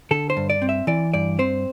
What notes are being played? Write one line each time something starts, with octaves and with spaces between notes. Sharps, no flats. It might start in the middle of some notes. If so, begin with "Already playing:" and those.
D3 A4
C5
G2
D5
C4
E5
E3 D5
G2 D5
C4 C5